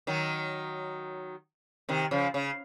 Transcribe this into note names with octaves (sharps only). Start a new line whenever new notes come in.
D#3 F#3
C3 D#3
C#3 F3
C#3